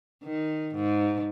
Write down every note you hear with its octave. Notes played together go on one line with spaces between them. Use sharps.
D#3
G#2